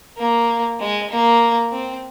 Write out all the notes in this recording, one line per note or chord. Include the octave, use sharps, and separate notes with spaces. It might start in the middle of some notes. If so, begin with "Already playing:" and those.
A#3
G#3
A#3
C4